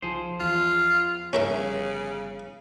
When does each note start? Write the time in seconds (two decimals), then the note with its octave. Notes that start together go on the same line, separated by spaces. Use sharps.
0.02 B1 F3 G#4 C5
0.40 E2 F4
1.33 G1 C#3 C#4 A#4 E5